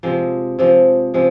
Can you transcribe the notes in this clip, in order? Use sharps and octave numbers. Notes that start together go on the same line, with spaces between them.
C3 F3 G#3
C3 F3 G#3
C3 F3 G#3